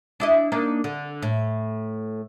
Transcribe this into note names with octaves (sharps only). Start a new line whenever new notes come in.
D4 E4 D#5
A#3 D4 D#4
D3
A2